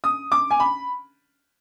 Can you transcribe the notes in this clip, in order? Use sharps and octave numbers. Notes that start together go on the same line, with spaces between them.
D#6
D6
G#5
B5